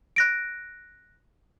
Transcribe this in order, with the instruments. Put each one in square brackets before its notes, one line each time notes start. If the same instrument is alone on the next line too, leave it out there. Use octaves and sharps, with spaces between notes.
[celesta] F#6 A#6 D7